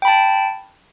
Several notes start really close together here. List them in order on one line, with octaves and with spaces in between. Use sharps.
G5 B5 A5